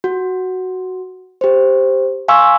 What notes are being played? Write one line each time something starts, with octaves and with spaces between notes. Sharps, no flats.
F#4
G4 C5
F5 G#5 C6 C#6 E6